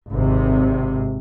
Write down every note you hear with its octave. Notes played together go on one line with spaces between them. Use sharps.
G#1 C3